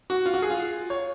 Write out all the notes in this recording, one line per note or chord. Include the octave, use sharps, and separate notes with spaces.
F#4
F4
F#4
G#4
F4
C#5